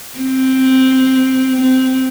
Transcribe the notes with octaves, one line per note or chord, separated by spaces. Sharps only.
C4
C4